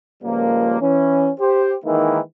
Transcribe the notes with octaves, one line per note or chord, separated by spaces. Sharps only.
C#2 F3 G3 A#3
E3 C#4
G4 C5
D#3 E3 G#3 A#3 D#4 E4